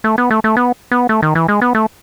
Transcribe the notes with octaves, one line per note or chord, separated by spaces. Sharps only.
A3
B3
A3
A3
B3
B3
A3
D#3
E3
G#3
B3
A3